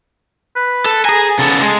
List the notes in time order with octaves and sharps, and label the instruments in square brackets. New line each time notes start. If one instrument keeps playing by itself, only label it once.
[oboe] B4
[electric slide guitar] A4
[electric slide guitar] G#4 G#5 [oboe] A#5
[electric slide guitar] C#3 B3 A4 [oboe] A5
[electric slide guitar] G#3